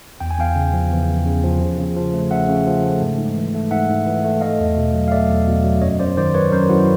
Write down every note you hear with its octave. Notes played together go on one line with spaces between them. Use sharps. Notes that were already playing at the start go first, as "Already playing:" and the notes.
E2 G5
G#5
E2 F5 G5
C#3
F3
E2
E2
C#3
F3
C#3
C#3
F3
A3
C#3 E5 F#5
C#3
F3
A3
G#2
G#2
E3
A3
G#2 E5 F#5
G#2
E3
A3
A3 D#5 F5
E2
B2
F#3
F5
A3 D5 E5
E2
B2
F#3
F#2 C#5 D#5
F#2 C5 D5
D#3 C5 D5
F#3 B4 C#5
F#2 A#4 C5
F#2 E4 F#4